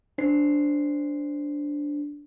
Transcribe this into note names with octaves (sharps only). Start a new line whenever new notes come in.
D4 C5 C7